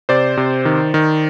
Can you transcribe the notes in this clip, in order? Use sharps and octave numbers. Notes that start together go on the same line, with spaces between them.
C3 C5 D5
C3
D#3
D#3